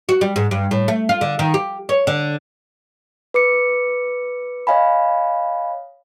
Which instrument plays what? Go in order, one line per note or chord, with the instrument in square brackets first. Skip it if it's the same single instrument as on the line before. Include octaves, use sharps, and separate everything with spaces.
[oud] F#4
G3
G#2
G2
A2
A3
F4
D3
D#3
G4
C#5
D3
[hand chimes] B4 D6 C#7
C#5 D#5 F5 G#5 B5